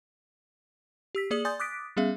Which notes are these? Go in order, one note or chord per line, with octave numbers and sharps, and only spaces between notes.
G4 E6 B6
A#3 G#4 D5 D#6 F#7
D5 G#5 C6 D#6 G6 A6
D6 D#6 F#6 A6 B6 D7
G3 B3 C#4 G#4 E5 F5